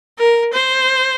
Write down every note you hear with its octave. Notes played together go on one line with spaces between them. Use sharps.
A#4
C5